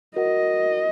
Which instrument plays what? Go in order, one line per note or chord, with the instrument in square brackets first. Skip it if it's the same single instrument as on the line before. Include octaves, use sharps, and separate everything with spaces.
[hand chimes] F#4 A#4 F#5 [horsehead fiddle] D#5